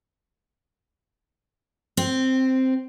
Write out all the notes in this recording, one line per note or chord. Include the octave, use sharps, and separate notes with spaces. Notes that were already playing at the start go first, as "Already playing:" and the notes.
C4